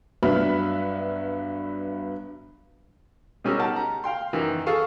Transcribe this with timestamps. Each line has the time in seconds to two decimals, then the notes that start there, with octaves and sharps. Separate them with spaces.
0.23 G2 F#3 B3 E5 B5 F6
3.44 B2 G3 C#4 G#4 A#4 E6
3.59 D#4 G4 F#5 A5
3.76 A#5
4.04 F5 G5 C6
4.33 F#2 D#3 E3
4.66 G#4 A4 F5 C#6